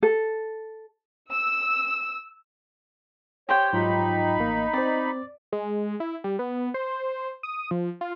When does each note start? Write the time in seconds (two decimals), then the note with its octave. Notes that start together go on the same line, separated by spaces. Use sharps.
0.03 A4
1.30 E6
3.49 G4 C5 C#5 G5
3.73 G#2 F#3 D#4 F4 B5
4.38 A1 A#3
4.74 C4 C5 D5
5.52 G#3
6.00 E4
6.24 G3
6.39 B3
6.74 C5
7.43 D#6
7.71 F3
8.01 F4